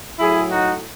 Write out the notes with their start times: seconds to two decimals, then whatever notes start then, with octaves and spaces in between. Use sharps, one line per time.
0.20 A2 F#3 E4 G#4
0.51 D#4 F#4